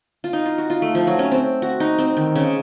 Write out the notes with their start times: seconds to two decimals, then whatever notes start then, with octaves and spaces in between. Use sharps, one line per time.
0.24 F4
0.33 D#4
0.46 F4
0.58 F#4
0.70 F4
0.82 A3
0.95 F3
1.07 F#3
1.19 C#4
1.32 C4
1.62 F#4
1.80 D#4
1.98 C4
2.17 D#3
2.36 C#3